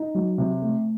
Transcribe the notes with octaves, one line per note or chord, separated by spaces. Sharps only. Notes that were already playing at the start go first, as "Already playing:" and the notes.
Already playing: D#4
F#3
C3
A3